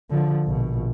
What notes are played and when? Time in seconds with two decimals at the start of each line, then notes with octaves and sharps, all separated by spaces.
0.10 D3 F3
0.44 A#1 B2